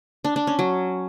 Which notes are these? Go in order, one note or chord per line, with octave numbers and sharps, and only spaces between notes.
D4
D4
C#4
F#3